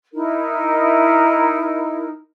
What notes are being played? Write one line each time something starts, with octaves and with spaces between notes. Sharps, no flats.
D#4 E4 A#4